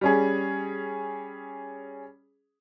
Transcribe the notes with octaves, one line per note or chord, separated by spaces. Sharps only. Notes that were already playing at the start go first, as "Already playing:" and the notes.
G3 C#4 G#4